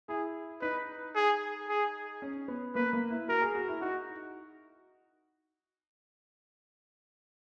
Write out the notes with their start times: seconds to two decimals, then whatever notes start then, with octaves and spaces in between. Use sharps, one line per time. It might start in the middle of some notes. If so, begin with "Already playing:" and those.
0.09 E4 G#4
0.62 D#4 B4
1.15 G#4
1.69 G#4
2.22 C#4
2.48 B3
2.75 A#3 B4
2.93 A#3
3.10 E4
3.28 F#4 A#4
3.42 G#4
3.55 F#4
3.68 E4
3.81 D#4 F#4